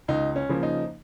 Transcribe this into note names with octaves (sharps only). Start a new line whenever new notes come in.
C#2 D#4
C#4
C#3 F3 A#3
D#4